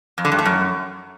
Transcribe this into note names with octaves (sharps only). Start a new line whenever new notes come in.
F2
D3
G2
A3
F#2